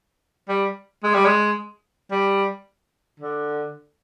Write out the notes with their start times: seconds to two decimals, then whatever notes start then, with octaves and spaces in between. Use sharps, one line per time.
0.49 G3
1.03 G#3
1.14 G3
1.25 G#3
2.11 G3
3.20 D3